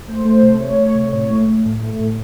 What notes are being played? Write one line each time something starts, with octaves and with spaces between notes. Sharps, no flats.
A3 C5
A3
C3
A3 C#5
A3
C3
A2 C#5
A3
A3
A2
A3
A2